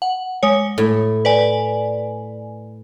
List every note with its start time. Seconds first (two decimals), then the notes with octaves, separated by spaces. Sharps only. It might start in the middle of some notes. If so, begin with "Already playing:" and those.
0.02 F#5
0.43 G#3 C#5
0.78 A2
1.25 B4 D5 G#5